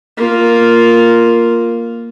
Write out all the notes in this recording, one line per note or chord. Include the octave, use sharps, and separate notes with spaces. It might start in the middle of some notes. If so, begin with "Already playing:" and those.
A#3 F4